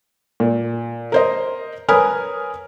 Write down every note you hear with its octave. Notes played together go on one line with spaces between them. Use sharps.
A#2
A#4 C5 D#5
A#4 B4 C#5 G#5 D#6 F6